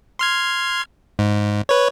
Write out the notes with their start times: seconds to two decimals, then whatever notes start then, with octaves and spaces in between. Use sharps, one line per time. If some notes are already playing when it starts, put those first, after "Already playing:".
0.19 C6 F6 G#6
1.19 G#2
1.69 B4 C#5